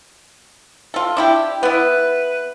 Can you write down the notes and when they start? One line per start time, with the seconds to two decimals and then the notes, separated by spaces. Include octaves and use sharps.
0.94 F4 A4
1.17 D4 E4 G4
1.63 B3 E4 B4